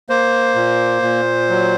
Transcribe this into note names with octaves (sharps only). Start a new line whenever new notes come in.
A#3 C5
A#2
A#2
F#3